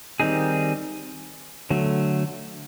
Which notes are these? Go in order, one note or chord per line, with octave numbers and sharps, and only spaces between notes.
D#3 G3 C4 D#4 G#4
D3 F#3 A3